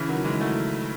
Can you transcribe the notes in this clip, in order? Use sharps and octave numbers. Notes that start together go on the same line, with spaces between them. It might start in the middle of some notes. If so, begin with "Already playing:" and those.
Already playing: C#3 E3
D#3 F#3
E3 G#3
F#3 A3